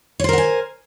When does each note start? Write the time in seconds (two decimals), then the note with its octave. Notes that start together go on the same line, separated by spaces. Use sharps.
0.20 C#5
0.24 C5
0.29 A#4
0.33 F#5
0.38 G#5